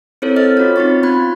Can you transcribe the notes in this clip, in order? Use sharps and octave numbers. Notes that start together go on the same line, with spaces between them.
C4 E4 A4 A#4 C5 C#5
D#5 F6 A6
C#4 F4 F#4 C#5
C4 D#4 F4 C#6 A6
B3 F4 B5 F#6 G#6